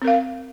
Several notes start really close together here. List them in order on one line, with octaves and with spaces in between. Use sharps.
C4 A#4 F5